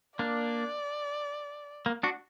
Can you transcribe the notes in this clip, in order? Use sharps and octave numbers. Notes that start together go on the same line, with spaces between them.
A#3 D4 D5
A#3
D4 F#4